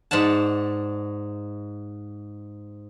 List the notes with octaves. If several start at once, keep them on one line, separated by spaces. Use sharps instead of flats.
G#2 D5 F#5 A5